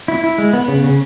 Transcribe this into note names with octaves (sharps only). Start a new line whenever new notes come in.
E4
E4
G#3
B3
C#3
C#3